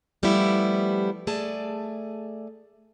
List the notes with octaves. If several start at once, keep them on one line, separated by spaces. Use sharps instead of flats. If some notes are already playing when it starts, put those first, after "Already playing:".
F3 G3 A3 B3 E4 G4
A3 G#4 D5 A5